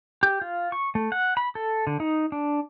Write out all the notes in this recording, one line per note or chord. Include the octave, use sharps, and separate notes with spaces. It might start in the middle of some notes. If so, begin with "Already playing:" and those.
G4
F4
C#6
A3
F#5
B5
A4
D3
D#4
D4